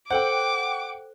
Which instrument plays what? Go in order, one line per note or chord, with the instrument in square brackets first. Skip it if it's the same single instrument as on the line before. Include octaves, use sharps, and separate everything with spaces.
[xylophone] A4 C5 [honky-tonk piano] F#5 G5 [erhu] D6